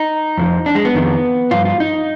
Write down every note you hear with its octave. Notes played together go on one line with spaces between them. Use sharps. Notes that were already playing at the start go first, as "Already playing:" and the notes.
Already playing: D#4
F2 D3 F3
D4
G#3
B3
F2 D#3
G2 F3 F4
F4
D#4